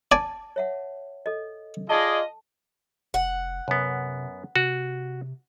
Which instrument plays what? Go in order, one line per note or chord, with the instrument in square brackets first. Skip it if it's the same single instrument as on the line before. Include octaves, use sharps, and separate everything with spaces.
[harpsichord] D5 G#5 [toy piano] A5
[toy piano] C#5 E5 F#5
A4 D#5
[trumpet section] F4 G#4 D5 [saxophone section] D#5 [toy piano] A5
[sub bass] F1 [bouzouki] F#5
[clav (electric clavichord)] F#2 B3 [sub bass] C3
[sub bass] C3 [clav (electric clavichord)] F#4